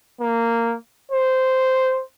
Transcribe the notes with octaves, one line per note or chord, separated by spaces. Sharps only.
A#3
C5